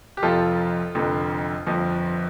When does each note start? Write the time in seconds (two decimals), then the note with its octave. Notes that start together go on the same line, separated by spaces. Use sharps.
0.17 G4
0.22 F1 F2 F3 F4 A4
0.95 F1 F2 D3
1.67 G1 F2 F3